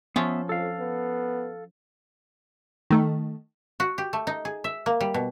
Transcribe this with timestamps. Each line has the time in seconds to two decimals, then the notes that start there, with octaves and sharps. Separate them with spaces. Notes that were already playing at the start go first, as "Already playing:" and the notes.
0.16 F3 B3 C#4 F4 E5
0.49 F2 A4 F5
0.79 B3
2.90 D#3 A3
3.80 F#4
3.98 G4
4.13 A3
4.27 D#4
4.45 G#4
4.64 E5
4.86 A#3
5.01 G3
5.14 B2